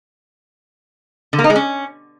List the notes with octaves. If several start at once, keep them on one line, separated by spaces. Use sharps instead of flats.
D3
A#3
D#4
G#3
C#4